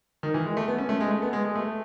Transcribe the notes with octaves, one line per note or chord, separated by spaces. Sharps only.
D#3
E3
G#3
A3
B3
C#4
A3
G#3
A3
B3
G#3
G#3
A3